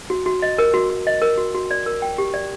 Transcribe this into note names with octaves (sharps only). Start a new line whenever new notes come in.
F#4
F#4
D#5
A#4
F#4
F#4
D#5
A#4
F#4
F#4
D5
A#4
G5
G4
D5